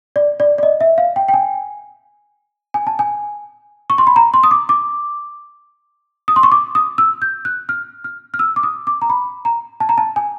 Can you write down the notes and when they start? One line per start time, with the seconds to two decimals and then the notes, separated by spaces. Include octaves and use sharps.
0.16 D5
0.40 D5
0.58 D5
0.63 D#5
0.81 E5
0.98 F5
1.16 G5
1.28 G5
1.34 G#5
2.74 G#5
2.87 A5
2.99 G#5
3.90 C#6
3.98 C6
4.07 B5
4.16 A#5
4.34 C6
4.43 D#6
4.51 D6
4.69 D6
6.28 D#6
6.36 C6
6.43 C#6
6.52 D6
6.75 D#6
6.98 E6
7.22 G6
7.45 F#6
7.69 F6
8.04 F6
8.34 F6
8.39 E6
8.56 D6
8.63 D#6
8.87 D6
9.02 A#5
9.10 B5
9.45 A#5
9.80 A5
9.89 A#5
9.98 A5
10.16 G#5